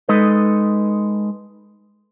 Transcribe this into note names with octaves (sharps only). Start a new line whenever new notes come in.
G#3 D#4 A4 B4 D#5